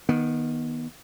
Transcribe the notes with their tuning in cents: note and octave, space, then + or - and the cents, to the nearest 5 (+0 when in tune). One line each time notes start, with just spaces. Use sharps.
D#3 +0 B3 -30